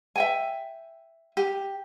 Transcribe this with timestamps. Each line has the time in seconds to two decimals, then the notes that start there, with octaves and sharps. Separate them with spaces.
0.16 E5 G5 G#5
1.37 G4